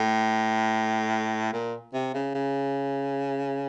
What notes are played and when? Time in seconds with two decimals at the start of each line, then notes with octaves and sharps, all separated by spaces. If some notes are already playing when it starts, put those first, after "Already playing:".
Already playing: A2
1.53 A#2
1.94 C3
2.14 C#3
2.35 C#3